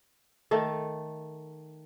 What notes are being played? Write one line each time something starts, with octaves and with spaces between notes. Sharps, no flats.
D#3 A3 A4